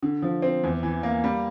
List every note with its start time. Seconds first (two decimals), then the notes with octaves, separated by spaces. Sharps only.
0.03 D3
0.22 F3
0.42 C4
0.63 E2
0.83 E3
1.03 A#3
1.24 G3